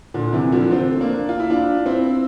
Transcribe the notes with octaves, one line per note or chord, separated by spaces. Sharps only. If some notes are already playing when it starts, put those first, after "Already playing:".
A#2 D3
C3 E3
D3 F3
A3 C4
A#3 D4
F4
E4
D4 F4
C4 E4